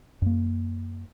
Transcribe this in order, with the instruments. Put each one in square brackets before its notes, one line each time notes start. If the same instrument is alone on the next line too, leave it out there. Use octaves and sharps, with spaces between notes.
[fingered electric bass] F#2 A#3